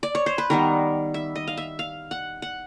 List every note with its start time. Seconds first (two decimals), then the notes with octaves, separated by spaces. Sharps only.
0.03 D5
0.15 C#5
0.26 C5
0.38 B4
0.50 D#3 G3 B3 A#4
1.14 E5
1.35 D#5
1.47 F5
1.57 E5
1.79 F5
2.11 F#5
2.42 F#5